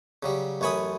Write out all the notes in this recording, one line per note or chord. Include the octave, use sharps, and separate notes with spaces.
C#3 F#3 G3
A1 F#2 C#5 G#5 B5 D#6